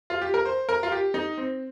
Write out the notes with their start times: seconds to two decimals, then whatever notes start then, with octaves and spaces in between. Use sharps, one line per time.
0.10 F4
0.22 G4
0.34 A#4
0.45 C5
0.69 A#4
0.83 F4
0.92 G4
1.14 D#4
1.37 C4